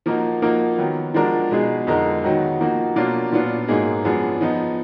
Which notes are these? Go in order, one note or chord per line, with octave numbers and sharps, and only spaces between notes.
F3 A#3 D#4 F#4 A#4
F3 A#3 D#4 F#4 A#4
D#3 F#3 B3
F3 G#3 D4 F#4 A#4
B2 G#3 D#4 G#4
F2 D3 G#3 D#4 A#4
D#3 F#3 B3 D#4 F#4
F3 A#3 D#4 F#4
B2 F#3 A#3 D4 F4
A#2 F#3 B3 D4 F4
G#2 F#3 A#3 D#4 G#4
F#2 F3 B3 D4 G#4
F3 B3 D#4